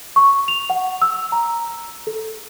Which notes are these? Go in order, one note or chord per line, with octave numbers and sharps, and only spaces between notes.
C#6
F7
F#5
E6
A#5
A4